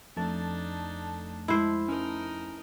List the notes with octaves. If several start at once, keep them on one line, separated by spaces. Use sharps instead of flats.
F2 A3 D4 D#4 A5
G#3 E4 C5
C#4 D#4 A#4